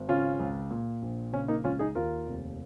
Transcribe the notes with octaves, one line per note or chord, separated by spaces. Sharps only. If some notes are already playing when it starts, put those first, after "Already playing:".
Already playing: G#1
C#3 C#4 F4
C#2
A#2
A#1
C#3 C#4
A#3 D#4
C#2 C#4 F4
D#4 G#4
D#2 F4 A#4
F1